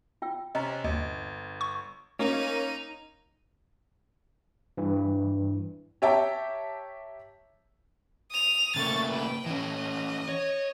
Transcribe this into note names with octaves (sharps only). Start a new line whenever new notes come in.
F4 G5 E6
C3 C#4 D#5 A#5
G1 D#2 D#5
C#6
A#3 C#4 D#4
G2 E3
G4 C#5 E5 G5 A5 A#5
D#6 F7
C#3 A3 A#3 C#6 A6
B4 G5
E3 C#4 D#5
C#5